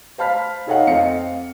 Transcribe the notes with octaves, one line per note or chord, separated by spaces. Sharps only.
C5 F5 A5 B5 F6 B6
D#4 A4 C#5 D#5 F5 F#5
F2 C4 D#5 F5 C#7